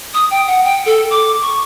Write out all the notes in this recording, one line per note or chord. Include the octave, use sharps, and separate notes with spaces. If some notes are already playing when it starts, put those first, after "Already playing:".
D#6
G5
F#5
G5
A4
D6
C#6